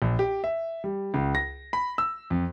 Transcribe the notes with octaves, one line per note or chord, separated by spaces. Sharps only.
A#1
G4
E5
G3
C#2
A#6
B5
E6
F2